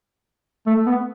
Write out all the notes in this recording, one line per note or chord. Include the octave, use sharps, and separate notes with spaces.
A3
B3